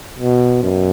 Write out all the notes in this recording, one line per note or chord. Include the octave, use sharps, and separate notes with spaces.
B2
F#2